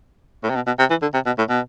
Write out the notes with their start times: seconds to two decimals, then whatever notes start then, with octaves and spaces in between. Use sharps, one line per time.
0.44 A2
0.50 C3
0.55 B2
0.67 B2
0.79 C3
0.90 E3
1.02 D3
1.14 C3
1.26 B2
1.38 A2
1.50 B2